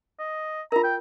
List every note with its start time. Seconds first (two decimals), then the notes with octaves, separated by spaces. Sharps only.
0.20 D#5
0.72 F4 A#4 A#5
0.84 G5